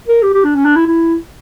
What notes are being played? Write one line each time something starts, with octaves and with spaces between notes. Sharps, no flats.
A#4
G4
G4
D4
C#4
D4
E4
E4